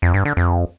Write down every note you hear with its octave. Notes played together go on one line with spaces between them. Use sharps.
F2
G2
D3
F2